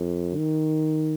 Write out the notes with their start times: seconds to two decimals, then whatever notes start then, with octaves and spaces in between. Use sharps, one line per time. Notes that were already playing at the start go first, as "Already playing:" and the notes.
Already playing: F2
0.36 D#3